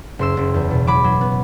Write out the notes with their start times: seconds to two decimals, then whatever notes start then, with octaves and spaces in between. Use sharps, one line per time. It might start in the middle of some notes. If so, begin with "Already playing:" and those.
0.19 F#1 C6 E6
0.37 F#1
0.54 E2
0.71 B2
0.87 F#3 B5 D6
1.04 F#3
1.21 B3